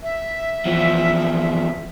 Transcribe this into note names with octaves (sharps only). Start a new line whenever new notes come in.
E5
E2 F3